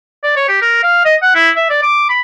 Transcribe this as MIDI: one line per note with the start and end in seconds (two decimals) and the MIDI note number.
0.24 0.33 74
0.36 0.44 73
0.48 0.59 67
0.61 0.82 70
0.83 1.04 77
1.05 1.16 75
1.22 1.31 78
1.35 1.49 64
1.56 1.68 76
1.70 1.83 74
1.83 2.04 86
2.09 2.21 83